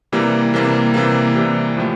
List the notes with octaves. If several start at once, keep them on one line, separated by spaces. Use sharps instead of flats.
C3 E3 G3 A#3
C3 E3 G3 A#3
C3 E3 G3 A#3
C3 E3 G3 A#3
A2 F3 A3